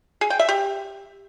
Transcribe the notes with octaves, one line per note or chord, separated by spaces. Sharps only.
G#4
G5
E5
G4